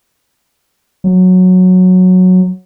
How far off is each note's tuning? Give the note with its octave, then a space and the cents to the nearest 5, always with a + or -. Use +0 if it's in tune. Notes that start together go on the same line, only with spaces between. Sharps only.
F#3 -10